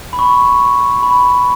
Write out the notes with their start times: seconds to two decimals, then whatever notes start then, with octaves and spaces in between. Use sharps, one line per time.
0.13 B5
0.19 C#6
1.03 B5